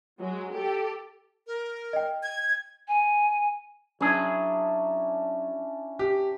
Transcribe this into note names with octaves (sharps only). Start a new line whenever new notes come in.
F#3 G#3
G4 A4
A#4
D#5 G5
G#6
G#5
F#3 C#4 D4 E4 G#4
G4